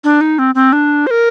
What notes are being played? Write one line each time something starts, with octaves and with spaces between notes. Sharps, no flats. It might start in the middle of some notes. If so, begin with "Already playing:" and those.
D4
D#4
C4
C4
D4
C5
A#4